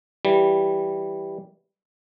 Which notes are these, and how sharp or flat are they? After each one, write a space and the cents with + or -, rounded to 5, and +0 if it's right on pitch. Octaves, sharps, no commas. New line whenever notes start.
E3 +0 G3 +0